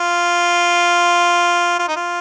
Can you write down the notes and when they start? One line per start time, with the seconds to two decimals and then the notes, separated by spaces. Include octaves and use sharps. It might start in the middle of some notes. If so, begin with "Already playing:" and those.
Already playing: F4
1.79 F4
1.88 D#4
1.96 F4